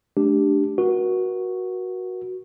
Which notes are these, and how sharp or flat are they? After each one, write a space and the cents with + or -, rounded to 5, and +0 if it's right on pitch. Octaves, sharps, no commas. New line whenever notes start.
A3 -40 D4 +0 G4 +0
F#4 +0 A#4 +40